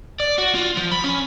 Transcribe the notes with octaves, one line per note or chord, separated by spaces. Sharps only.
D5
F#4
F4
F3
B5
C#4